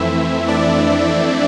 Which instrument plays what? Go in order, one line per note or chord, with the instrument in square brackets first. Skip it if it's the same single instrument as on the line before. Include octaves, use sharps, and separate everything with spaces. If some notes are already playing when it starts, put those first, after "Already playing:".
Already playing: [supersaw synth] F2 E3 A3 C4 E4 E5
D4 D5